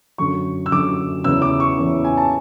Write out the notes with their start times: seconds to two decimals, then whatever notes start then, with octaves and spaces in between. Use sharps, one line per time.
0.18 F#2 D3 C#6
0.66 E6
0.71 F#2 D3 D6
1.24 E2 C#3 E3 E6
1.42 D6
1.60 C#6
1.78 E2 C#3 E3
2.05 G#5
2.17 A5